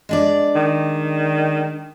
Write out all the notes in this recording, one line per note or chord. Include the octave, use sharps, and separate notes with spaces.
G#3 D4 D5
D#3